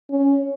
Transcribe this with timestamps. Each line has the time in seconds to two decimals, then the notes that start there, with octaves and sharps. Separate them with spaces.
0.10 C#4